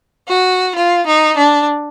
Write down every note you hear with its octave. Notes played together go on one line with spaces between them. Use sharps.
F#4
F4
D#4
D4